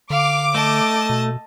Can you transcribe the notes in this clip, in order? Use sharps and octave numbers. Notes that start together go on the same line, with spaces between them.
D3 F5 D6
A3 D#5 A5
B2